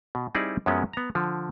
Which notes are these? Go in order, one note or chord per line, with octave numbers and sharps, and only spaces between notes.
B2
G3 C4 D#4 E4 G#4 D5
F#2 F3 F#3 G#3 B3 C#4
B3 A#5
D3 F3